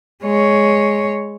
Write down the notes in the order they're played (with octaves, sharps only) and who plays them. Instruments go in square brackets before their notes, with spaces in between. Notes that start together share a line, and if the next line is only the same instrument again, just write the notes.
[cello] G#3 C#5